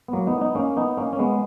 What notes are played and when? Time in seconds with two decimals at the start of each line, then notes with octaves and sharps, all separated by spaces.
0.08 B3
0.13 F#3 A#3
0.27 B3 D#4
0.41 B3 D#4
0.55 A#3 C#4
0.77 B3 D#4
0.97 A#3 C#4
1.13 C#4
1.19 G#3 B3